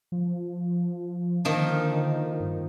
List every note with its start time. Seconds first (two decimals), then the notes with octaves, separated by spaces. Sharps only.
0.12 F3
1.45 D3 D#3 F3 A#3
2.40 G2